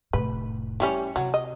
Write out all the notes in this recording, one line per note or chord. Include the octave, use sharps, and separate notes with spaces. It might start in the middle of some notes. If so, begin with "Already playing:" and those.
F1 A2 B4
E3 G3 C#4
C3 F#3
D#5